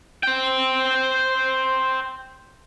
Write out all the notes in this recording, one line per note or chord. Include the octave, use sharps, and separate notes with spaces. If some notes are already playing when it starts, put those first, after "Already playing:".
C5 G5